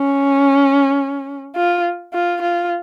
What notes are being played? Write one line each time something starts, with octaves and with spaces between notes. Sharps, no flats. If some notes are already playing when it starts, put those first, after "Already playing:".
Already playing: C#4
F4
F4
F4